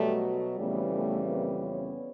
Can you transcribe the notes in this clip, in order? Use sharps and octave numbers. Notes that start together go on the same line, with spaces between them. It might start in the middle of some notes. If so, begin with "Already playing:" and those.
Already playing: B2 F#3 G3 A3
F2 C#3 E3 G3 A3 B3
A3 B3
A#3 C4
B3 C#4